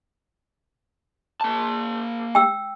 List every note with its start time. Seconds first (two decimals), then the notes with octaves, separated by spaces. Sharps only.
1.41 A#3 A5
2.35 G5 E6